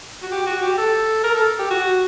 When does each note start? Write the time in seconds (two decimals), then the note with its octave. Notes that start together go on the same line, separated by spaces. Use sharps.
0.23 F#4
0.32 G4
0.47 F#4
0.62 G4
0.78 A4
1.24 A#4
1.36 A4
1.59 G4
1.71 F#4